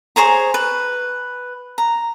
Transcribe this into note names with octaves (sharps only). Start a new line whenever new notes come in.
G#4 C5 C#5 A#5
B4
A#5